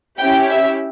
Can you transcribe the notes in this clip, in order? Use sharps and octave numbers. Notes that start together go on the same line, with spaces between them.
C#4 E4 G4 G5
E5